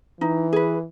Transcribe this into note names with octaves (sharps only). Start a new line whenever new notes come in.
E3 D#4
G#4 B4